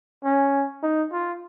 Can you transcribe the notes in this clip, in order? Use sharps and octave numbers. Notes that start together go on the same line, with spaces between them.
C#4
D#4
F4